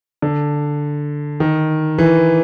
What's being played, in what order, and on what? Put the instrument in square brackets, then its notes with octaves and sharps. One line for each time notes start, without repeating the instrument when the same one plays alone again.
[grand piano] D3
D#3
E3